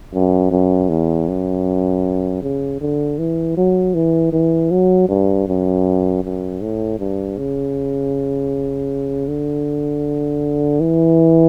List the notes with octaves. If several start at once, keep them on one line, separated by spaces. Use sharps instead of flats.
F#2
F#2
E2
F#2
C#3
D3
E3
F#3
E3
E3
F#3
G2
F#2
F#2
A2
G2
C#3
D3
E3